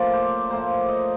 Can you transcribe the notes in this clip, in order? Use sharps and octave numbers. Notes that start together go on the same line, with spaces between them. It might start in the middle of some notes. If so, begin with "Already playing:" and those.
Already playing: A2 F3 A#3 G4 D5
C5
A2 F3 A#3 C5
D#5